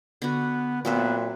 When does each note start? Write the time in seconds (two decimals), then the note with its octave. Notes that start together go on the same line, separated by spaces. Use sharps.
0.22 D3 B3 F#4
0.85 A#2 F#3 B3 C4 E5